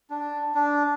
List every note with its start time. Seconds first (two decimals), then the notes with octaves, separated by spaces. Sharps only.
0.10 D4
0.55 D4